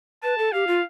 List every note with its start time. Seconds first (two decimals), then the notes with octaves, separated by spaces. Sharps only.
0.23 B4 A5
0.38 A4
0.52 G4 F5
0.67 F4